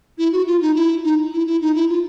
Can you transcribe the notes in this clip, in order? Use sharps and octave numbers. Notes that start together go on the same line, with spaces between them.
E4
F#4
F4
D#4
E4
D#4
E4
E4
D#4
E4
F4